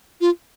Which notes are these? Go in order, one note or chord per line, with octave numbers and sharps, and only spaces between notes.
F4